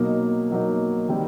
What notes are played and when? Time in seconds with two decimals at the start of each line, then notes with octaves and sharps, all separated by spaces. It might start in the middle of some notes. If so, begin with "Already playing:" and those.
Already playing: B2 F#3 A#3 D#4
0.51 B2 F#3 A#3 D#4
1.09 D#3 G3 C4 D#4